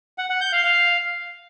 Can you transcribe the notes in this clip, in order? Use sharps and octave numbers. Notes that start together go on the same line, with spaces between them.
F#5
F#5
G6
F5
F5